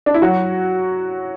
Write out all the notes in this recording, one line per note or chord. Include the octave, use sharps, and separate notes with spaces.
D4
E4
F#3 F#4